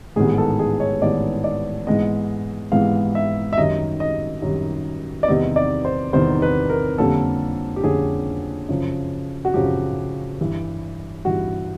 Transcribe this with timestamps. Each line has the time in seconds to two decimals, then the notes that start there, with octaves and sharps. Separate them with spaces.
0.16 A1 G#2 D#3 G3 B3 G#4
0.38 A4
0.59 G#4
0.80 C#5
1.02 A1 G#2 D#3 G3 B3 D5
1.44 D5
1.87 G#2 E3 G#3 B3 D#5
2.72 G#2 E3 G#3 B3 F5
3.15 E5
3.53 E5
3.58 F#2 D#3 G3 D#5
4.00 D#5
4.42 F#2 D#3 G3
5.23 D5
5.28 E2 C3 D#3 G3 B3 D#5
5.56 D5
5.85 C5
6.13 E2 C3 D#3 G3 B3 C5
6.42 B4
6.70 A#4
6.98 F2 D3 G3 A#3 C#4 A4
7.76 G4
7.83 F2 D3 G3 A#3 C#4 G#4
8.69 F#2 C#3 F3
9.45 F#4
9.54 F#2 C#3 F3 G4
10.40 G2 E3 G3
11.25 G2 E3 G3 F#4